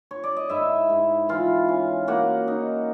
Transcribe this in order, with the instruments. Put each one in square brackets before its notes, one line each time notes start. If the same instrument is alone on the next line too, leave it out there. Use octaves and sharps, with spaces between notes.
[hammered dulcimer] C#5
D5
D#5
G#2 E4 E5
G#2
E3 F4 F5
C#4
A#3 F#4 F#5
D#4